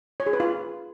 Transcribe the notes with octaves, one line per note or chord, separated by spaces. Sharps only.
C#5
G#4
B4
F4